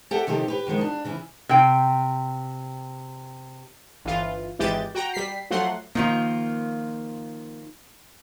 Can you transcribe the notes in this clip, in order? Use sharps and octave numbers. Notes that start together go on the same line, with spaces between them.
G4 A4 E5 F#5 G5 A5
C3 D#3 F3 A3 G4
G4 B4
F#2 D#3 F3 G#3
D4
C#3 E3 E4
C3 G5
G1 E3 F4
G#1 E3 G#3 G4 G6 A6
F#4 G5 A#5
G3 B6 C7
F3 F#3 A3 F#5 C6
D#3 F3 A#3 F4